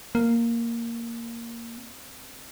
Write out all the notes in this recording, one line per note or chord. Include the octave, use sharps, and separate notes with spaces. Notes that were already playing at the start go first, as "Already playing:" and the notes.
A#3
C4